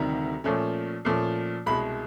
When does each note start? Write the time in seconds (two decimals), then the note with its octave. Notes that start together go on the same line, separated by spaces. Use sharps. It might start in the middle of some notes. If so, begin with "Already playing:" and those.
Already playing: D2 C3 D#3 G3 A#5
0.44 A#2 F3 A3 C#4
1.05 A#2 F3 A3 C#4
1.66 C2 B2 G#3 B5